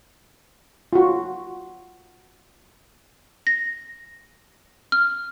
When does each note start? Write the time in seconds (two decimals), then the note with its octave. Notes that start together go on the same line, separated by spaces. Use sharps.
0.93 F4 F#4
3.47 A#6
4.92 F6